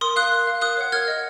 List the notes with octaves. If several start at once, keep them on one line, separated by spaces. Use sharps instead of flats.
A#4 C6 D#6
F5 D#6 F#6
A#4
F5
A#4 D#6 F#6
C#5 F#5
A#4 F6 G#6
D#5 F#5